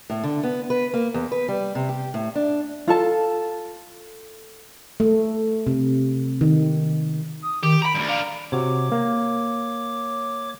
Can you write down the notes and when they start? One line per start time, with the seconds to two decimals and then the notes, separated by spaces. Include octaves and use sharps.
0.10 A2
0.24 D3
0.43 B3
0.70 B4
0.94 A#3
1.14 E2
1.32 B4
1.48 G3
1.75 C3
1.89 G4
2.14 A2
2.35 D4
2.88 F4 A4 A5
5.00 A3
5.67 C3
6.41 D#3
7.42 D#6
7.63 D#3 G4
7.82 A#5 B5 D7
7.95 D2 G2
8.09 D4 A#4 F5
8.52 C3 F#4 C#5 D6
8.92 A#3